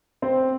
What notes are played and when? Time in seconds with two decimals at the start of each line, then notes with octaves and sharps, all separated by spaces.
0.22 C4 C5